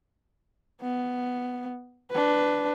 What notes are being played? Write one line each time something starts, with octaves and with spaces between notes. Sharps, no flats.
B3
D4 B4